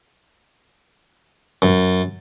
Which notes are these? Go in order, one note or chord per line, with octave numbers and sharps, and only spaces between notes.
F#2